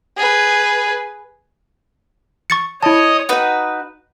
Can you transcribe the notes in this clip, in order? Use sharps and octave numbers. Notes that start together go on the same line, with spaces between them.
G#4 B4
C#6 A6 C#7
E4 C#5 D#5 A5 D#6
D#4 F#4 B4 F#5